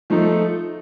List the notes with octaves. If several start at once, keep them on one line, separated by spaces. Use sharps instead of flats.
F3 A3 D#4 A4